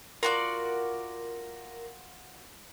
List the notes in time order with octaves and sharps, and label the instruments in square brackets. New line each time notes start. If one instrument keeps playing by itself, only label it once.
[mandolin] F4 F#4 D5 [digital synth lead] A#4